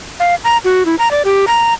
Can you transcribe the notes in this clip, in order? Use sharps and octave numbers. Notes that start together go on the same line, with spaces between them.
F5
A#5
F#4
E4
A#5
D5
G4
A#5